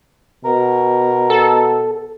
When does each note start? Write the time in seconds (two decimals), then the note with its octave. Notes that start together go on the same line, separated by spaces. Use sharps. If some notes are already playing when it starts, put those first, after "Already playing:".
0.45 B2 A#4
1.30 A4